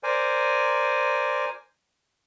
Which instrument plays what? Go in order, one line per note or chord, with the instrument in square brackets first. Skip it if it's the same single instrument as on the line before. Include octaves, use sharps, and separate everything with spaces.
[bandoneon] A#4 C5 D5 G#5